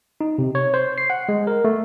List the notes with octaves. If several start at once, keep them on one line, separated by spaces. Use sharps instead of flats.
D#4
C3
C#5
C5
C7
F#5
G#3
A#4
A3